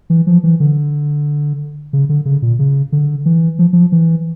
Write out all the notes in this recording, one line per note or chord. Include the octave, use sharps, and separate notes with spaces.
E3
F3
E3
D3
C#3
D3
C#3
A#2
C#3
D3
E3
F3
F3
E3